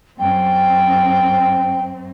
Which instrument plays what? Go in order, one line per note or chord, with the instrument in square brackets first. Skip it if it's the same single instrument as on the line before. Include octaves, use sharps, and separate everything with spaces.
[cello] F#2 C4 [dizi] G5